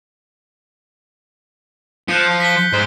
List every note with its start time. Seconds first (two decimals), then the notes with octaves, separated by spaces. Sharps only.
2.08 F3 F#6 G6 C#7
2.40 B6 G7
2.73 G#2 C5